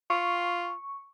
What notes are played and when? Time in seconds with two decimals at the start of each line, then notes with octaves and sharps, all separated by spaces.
0.10 F4 C#6